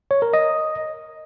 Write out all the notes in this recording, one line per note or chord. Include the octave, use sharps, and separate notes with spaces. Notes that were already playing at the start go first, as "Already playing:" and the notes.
C#5
A#4
D#5